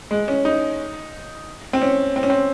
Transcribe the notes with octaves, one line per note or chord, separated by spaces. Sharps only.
G#3
C#4
D#4
C4
C#4
C4
C#4
C4